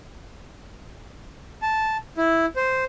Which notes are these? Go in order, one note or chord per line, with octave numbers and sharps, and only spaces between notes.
A5
E4
C5